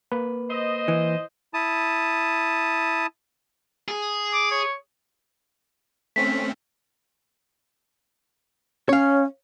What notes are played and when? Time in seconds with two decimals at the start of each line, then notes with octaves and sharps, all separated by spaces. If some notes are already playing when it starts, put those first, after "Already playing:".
0.12 A#3 B4
0.50 C5 D#5
0.88 E3
1.54 E4 A5 D#6
3.88 G#4
4.33 D6
4.51 C#5
6.16 A3 C4 C#4 B6
8.89 C#4 C#5 F5